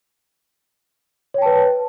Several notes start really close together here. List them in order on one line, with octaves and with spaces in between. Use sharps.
C#5 G5 A5 B4